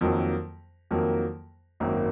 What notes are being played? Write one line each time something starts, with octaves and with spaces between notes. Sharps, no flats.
F2 D#3 F#3 A#3
F2 D#3 F#3 A#3
G#1 F#2 D#3 A#3